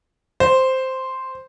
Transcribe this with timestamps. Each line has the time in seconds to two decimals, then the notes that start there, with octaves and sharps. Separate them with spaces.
0.40 C5